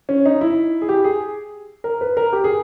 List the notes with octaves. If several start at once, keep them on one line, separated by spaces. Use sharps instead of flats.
C#4
D#4
E4
G#4
G4
G#4
A#4
B4
A#4
G4
G#4